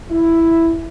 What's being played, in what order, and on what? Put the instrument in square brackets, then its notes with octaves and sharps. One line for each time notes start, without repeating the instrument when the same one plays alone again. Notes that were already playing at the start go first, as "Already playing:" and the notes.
[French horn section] E4